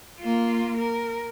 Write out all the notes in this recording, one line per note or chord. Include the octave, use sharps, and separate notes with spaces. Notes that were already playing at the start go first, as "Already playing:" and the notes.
A#3 F4
A#4